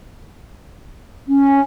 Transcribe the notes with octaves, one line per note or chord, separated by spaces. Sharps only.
C#4